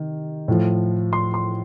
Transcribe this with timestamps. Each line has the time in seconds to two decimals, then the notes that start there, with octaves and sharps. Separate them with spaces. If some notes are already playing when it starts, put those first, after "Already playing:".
Already playing: C3 D#3
0.48 A2 F3
1.13 C6
1.34 C6